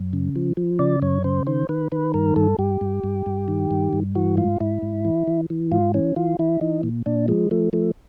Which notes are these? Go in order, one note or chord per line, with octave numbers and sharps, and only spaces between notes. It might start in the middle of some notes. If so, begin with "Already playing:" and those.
Already playing: F#2
C#3
F3
F3
C#3 D5
F#2 C#5
C#3 C5
D#3 C5
D#3 B4
D#3 B4
G2 A#4
G2 A4
G2 G4
G2
G2
G2
D#3
G2
G2
E3 F#4
G#2 F4
G#2 E4
G#2
E3
E3
E3
G#2 F4
E3 C#4
E3 F4
E3 E4
E3 D#4
A#2
A#2 D4
F3 G#3
F3 A3
F3 A3